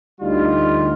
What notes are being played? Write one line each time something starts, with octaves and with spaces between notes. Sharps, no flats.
D2 G3 D#4 F4